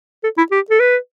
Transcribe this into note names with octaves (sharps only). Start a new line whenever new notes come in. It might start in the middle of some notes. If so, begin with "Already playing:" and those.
A4
E4
G4
A4
B4